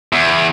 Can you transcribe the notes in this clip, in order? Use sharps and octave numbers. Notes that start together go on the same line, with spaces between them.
E2